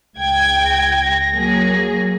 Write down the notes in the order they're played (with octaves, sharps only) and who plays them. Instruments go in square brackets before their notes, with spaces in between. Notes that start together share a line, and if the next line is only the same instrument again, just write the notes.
[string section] C#2 G5 G#6
[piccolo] A#6
[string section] F#3 A#3 G#4